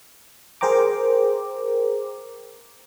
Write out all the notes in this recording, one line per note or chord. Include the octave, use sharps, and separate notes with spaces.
G#4 A#4 C5 G5 A#5 D6